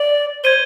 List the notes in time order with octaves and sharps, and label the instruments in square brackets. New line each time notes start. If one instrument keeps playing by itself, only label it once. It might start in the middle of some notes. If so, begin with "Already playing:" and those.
Already playing: [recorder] D5
[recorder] C5 [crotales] G#6 D#7 G7